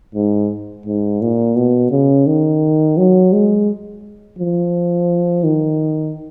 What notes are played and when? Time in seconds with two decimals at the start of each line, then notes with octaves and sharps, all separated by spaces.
0.15 G#2
0.86 G#2
1.22 A#2
1.57 B2
1.91 C#3
2.26 D#3
2.97 F#3
3.33 G#3
4.39 F3
5.44 D#3